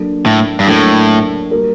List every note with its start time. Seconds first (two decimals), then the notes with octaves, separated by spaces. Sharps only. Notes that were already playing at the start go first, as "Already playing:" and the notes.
Already playing: F#3 A#3 D4 A4
0.26 A2
0.60 G2
0.67 A2 F#3 A#3 D4 A4
1.51 G3 A#3 F#4 A#4